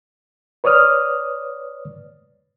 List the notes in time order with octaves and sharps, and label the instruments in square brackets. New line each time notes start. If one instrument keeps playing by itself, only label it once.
[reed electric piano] B4 C#5 D5 D#6 F6